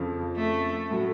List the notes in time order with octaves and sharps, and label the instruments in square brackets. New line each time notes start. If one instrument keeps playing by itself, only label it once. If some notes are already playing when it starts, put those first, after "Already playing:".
Already playing: [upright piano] F2 C#3 F3
[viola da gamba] A3
[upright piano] A2 F#3 A3